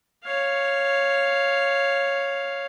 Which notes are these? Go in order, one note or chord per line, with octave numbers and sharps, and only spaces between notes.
C#5 F5